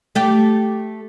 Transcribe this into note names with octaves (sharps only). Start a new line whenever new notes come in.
A3 G4